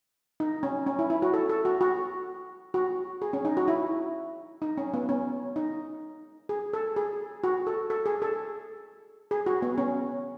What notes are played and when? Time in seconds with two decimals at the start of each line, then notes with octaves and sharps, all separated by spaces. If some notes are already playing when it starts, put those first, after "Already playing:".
0.40 D#4
0.63 C#4
0.87 C#4
0.99 E4
1.10 E4
1.22 F#4
1.34 A4
1.49 A4
1.65 F#4
1.81 F#4
2.74 F#4
3.22 G#4
3.33 C#4
3.45 D#4
3.57 F#4
3.68 E4
4.62 D#4
4.78 C#4
4.94 B3
5.09 C#4
5.56 D#4
6.49 G#4
6.73 A4
6.96 G#4
7.44 F#4
7.67 A4
7.90 A4
8.06 G#4
8.22 A4
9.31 G#4
9.46 F#4
9.62 B3
9.78 C#4